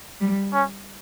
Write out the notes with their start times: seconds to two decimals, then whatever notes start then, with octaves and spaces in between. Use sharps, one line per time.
0.21 G3
0.53 C#4